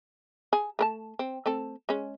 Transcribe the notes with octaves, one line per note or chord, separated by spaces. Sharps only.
G#4
A3 A#4 A5
C4
A3 C4 A4
G#3 C#4